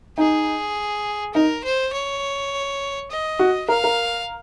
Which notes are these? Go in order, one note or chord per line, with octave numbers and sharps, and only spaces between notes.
D#4 G#4
D#4 A#4
C5
C#5
D#5
F#4
A#4 F5
A#4